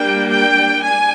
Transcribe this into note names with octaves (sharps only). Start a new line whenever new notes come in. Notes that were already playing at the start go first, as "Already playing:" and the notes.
Already playing: G3 A#3 D4 G5
G5
D4 G#5